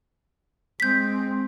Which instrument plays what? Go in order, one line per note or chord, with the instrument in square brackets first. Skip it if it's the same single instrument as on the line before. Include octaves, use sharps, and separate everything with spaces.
[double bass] G#3 C4 [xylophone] G6 B6